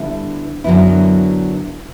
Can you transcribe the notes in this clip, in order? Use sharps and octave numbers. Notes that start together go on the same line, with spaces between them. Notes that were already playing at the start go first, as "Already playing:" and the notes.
Already playing: D3 G3 B3 E4
F#2 D3 F#3 B3 E4